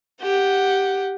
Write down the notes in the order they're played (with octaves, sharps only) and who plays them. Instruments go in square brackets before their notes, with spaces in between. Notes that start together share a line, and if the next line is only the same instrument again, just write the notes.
[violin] G4 F#5